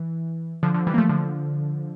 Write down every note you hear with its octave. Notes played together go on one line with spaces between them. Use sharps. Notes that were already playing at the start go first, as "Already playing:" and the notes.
Already playing: E3
D3 F3
D3 F3
E3 G3
A#3
F3 A3
D3 F3